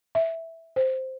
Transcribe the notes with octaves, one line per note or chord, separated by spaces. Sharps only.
E5
C5